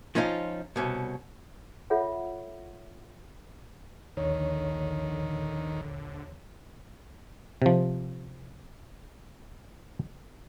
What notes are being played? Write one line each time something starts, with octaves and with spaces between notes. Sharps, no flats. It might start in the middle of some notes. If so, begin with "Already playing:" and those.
F3 C#4 D#4 F4
C2 B2 C#4
F4 A4 C#5 E5 F#5
A#1 D#2 D3 D#3 C#5
C3 F3